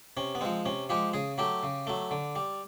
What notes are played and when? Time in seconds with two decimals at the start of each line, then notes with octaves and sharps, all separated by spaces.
0.17 C3 C#4
0.35 B3
0.41 F3 G#3 C4
0.65 C3 C#4
0.89 F3 G#3 G4
1.13 C#3 G#4
1.38 F#3 A3 G4
1.63 C#3
1.87 F#3 A3
2.11 D3
2.36 G3